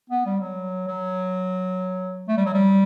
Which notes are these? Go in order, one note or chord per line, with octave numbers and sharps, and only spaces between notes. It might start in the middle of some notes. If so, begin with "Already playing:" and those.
B3
G3
F#3
F#3
A3
G3
F#3
G3